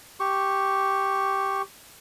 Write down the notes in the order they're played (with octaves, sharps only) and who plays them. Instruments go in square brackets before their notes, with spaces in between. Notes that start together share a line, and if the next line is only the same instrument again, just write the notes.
[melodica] G4 C#6